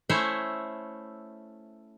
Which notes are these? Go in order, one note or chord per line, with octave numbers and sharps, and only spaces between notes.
A3 C#4 E4 C5 C#5 E5